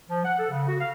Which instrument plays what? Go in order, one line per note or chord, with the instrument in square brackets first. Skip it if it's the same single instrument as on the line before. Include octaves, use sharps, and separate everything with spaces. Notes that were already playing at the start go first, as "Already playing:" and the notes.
[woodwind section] F3
F#5
A4
C#3
F#4
F5